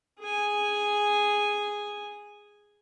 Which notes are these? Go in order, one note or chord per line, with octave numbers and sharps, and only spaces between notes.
G#4 G#5